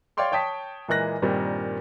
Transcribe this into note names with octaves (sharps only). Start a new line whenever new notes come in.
C#5 D5 F5 G5 C6 C#6
C#5 G5 A5 D#6 B6
A#2 E3 G#3 A#3 F#6 A#6
G2 A#2 D#3 G3 C4